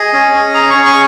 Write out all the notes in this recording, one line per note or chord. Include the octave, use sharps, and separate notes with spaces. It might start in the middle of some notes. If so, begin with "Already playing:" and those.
Already playing: G#4 D#5
C#4
C#4
G#4 A#5
C#4 C#6
C#6